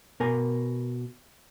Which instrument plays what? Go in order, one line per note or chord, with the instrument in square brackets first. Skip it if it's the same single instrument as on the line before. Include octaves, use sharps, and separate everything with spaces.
[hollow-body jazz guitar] B2 A#4 G#5